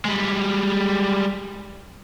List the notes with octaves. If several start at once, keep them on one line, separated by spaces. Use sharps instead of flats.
G3 G#3